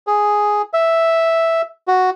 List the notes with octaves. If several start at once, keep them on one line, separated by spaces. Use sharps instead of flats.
G#4
E5
F#4